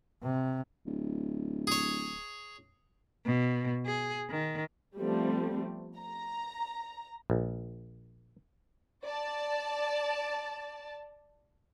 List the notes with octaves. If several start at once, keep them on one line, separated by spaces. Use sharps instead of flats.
C3
D1
G#4 C#5
B2
G#4
D#3
F3 G3 A3 B3 C4
A#5
A#1
D5 A5